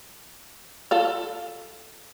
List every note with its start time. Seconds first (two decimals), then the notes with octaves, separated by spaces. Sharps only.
0.91 F4 A4 F5